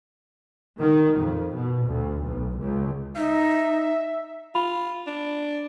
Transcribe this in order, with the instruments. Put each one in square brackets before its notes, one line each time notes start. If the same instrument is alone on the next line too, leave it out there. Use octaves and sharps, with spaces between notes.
[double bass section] D#3
F2
B2
D2
B1
C#2
[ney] D#4 [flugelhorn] E5
[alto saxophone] F4 [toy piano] B5
[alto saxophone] D4